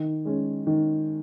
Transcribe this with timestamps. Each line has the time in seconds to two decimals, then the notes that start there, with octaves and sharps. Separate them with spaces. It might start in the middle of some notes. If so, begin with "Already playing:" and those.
Already playing: D#3
0.25 G#3 C#4
0.67 D#3